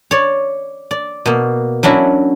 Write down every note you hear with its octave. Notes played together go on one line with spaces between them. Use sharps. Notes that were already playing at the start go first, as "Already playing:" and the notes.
C#5 D5
D5
B2 A#3
F#3 C#4 D4 E4 F#4